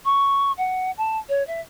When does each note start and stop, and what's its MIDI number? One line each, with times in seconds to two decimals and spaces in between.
0.05 0.52 85
0.57 0.91 78
0.97 1.17 81
1.29 1.43 73
1.47 1.60 76